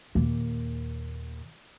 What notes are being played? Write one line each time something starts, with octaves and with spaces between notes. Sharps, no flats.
D#2 A#2